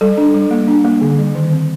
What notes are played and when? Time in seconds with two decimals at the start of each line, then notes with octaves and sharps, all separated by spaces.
0.01 G3 A4
0.17 D4
0.34 G3
0.51 A#3
0.68 D4
0.85 A#3
1.01 D3
1.19 G3
1.35 D#3
1.52 C4